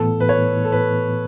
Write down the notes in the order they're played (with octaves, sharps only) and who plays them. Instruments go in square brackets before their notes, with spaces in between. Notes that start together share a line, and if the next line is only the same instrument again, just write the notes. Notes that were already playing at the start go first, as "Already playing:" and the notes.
Already playing: [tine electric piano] A2 E3 B3 [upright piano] A4
[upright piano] B4
C#5
A4
B4